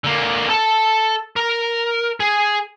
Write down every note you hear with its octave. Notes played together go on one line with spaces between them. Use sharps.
D3 A#3
A4 A5
A#4
G#4